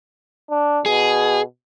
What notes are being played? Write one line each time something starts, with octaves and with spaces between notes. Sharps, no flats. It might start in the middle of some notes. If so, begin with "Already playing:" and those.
D4
B2 G#4